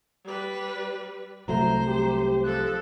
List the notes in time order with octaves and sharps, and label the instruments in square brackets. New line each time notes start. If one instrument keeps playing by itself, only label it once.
[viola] G3 B4
[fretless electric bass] C2 F#3 A3 [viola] C5 [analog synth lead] A#5
[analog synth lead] G4
[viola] F3 A4 [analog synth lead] F#6